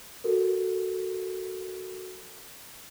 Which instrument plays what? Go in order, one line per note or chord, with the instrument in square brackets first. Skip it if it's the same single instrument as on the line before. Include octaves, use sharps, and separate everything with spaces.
[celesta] F#4 A4 A#4